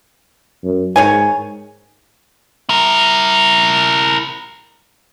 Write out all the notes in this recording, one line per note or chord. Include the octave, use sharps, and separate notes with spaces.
F#2
G#2 D#3 C#5 G#5
E4 A#4